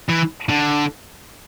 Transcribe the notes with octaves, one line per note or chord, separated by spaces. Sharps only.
E3
D3